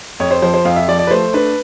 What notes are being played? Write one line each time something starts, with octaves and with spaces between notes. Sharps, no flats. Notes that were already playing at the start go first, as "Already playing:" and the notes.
F2 C#5
C5
F3 C5
C5
F2 F5
E5
F3 D5
D5
B4
A3 C5
D4 B4